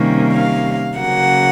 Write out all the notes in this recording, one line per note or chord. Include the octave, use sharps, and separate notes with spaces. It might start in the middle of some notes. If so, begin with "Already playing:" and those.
Already playing: C3 D#3 G3 A#3 C#4
F5
C#3 F#3 A#3 F#5